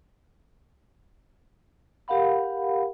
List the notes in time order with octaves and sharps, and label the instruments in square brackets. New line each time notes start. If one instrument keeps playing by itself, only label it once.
[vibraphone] G4 A#4 F5 F#5 B5